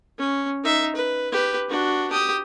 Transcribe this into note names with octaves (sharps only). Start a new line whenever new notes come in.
C#4
D#4 E5
B4
G4 B4
D4 F#4
G4 D#6